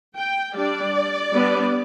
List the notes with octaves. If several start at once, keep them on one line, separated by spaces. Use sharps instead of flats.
G5
G3 D4 D5
G3 B3 D4